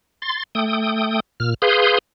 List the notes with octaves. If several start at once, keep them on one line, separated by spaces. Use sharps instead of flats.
C6 A6
A3 G5 D#6
A#2 F6
G#4 B4 F5 C6 D#6 G6